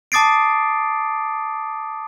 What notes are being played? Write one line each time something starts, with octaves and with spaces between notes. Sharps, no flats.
A5 D6 D#6 A6 C7 D7